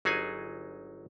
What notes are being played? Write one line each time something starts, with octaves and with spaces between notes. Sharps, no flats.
G1 F#3 D#4 G#4 G#5